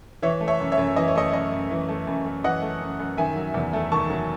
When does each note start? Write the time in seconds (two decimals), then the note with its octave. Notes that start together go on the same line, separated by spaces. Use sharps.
0.22 E3 C#5 E5
0.41 A3
0.48 C#5 E5
0.60 F#2
0.72 C#5 E5
0.78 F#2
0.96 E3 D#5
1.08 C#5
1.15 A3 D#5
1.33 F#2 D#5
1.51 F#2
1.71 E3
1.89 A3
2.07 F#2
2.26 F#2
2.44 E3 D#5 F#5
2.62 A3
2.81 F#2
2.99 F#2
3.17 D#3 E5 G#5
3.36 F#3
3.54 E2
3.73 A3
3.92 D#3 A5 C#6
4.10 F#3